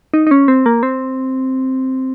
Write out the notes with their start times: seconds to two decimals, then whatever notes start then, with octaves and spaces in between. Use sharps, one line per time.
0.14 D#4
0.27 D#4
0.31 C#4
0.48 C4
0.66 A#3
0.83 C4